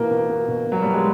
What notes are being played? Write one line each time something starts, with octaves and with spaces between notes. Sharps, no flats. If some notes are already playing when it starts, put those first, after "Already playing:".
Already playing: B2 E3 A#3
B2
B2
B2
B2
F#3
B2 G3
G#3